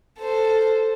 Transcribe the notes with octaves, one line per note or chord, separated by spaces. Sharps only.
A4 C5